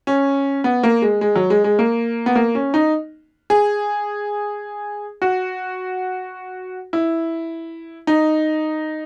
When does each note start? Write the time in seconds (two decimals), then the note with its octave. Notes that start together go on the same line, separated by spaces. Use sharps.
0.07 C#4
0.64 B3
0.83 A#3
1.02 G#3
1.21 G#3
1.35 F#3
1.50 G#3
1.64 G#3
1.79 A#3
2.26 B3
2.35 A#3
2.55 C#4
2.74 D#4
3.50 G#4
5.22 F#4
6.93 E4
8.07 D#4